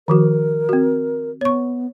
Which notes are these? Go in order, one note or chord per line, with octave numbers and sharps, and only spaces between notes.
D#3 F3 F#4 A#4
C4 F#4
B3 C#5 C#6